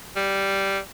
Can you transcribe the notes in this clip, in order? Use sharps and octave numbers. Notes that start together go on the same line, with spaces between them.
G3